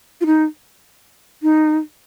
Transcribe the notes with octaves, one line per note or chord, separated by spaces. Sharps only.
F4
D#4
D#4